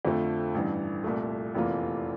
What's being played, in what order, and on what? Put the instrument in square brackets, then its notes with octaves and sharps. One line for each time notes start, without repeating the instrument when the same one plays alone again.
[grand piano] F2 D3 F3 A3
A1 G2 E3
C2 A#2 A3
F1 E2 E3 A#3 F4